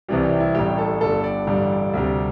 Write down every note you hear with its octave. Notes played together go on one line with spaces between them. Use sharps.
C2 C3 E3 G3 G4
G4
E4
A1 A2 G3 G4
A4
G1 G2 G3 A4
D5
A1 G2 D3 G3
D2 C3 G3